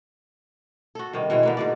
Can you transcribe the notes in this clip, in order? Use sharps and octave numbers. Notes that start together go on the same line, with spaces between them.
F#4 A4
G2 C3 D#3
B2 E3 G#3
D3 A#3 B3
G#2 B2 D5